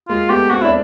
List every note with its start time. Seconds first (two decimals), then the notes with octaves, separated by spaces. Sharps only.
0.09 G#3 A#3 F4
0.30 A3 B3 G4
0.51 A#3 C4 F#4
0.62 D4 E4